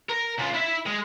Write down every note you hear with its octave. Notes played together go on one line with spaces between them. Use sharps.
A#4
C#3 F4
E4 E5
G#3